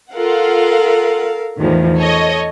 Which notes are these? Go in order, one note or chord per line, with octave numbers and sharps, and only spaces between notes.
F4 A4 A#4 F5 F#5
E2 A2 D#3 F3
A4 C#5 D#5